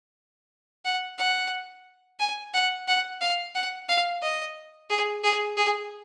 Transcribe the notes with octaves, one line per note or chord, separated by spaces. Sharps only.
F#5
F#5
G#5
F#5
F#5
F5
F#5
F5
D#5
G#4
G#4
G#4